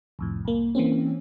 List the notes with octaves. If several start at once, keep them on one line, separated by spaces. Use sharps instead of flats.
C2 F2 A2
C2 A#3
E3 A#3 C4 C#4